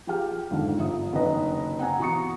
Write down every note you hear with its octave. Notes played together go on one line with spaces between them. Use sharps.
F3 G4 G#4 G5 F6
F2 G#2 D3 D#3
G1 F3 E5 D#6
F#1 D3 D#3 B4 D#5
C4 F#5 G#5 A#5
B2 E3 A#5 C#6 D#6 C#7